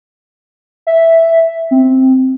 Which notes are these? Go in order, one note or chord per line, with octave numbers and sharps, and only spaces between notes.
E5
C4